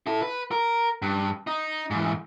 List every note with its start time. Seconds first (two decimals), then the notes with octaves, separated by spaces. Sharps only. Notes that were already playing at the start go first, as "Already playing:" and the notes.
0.07 E4 A4
0.22 B4
0.51 A#4
1.02 G2
1.47 D#4
1.90 G#2 E3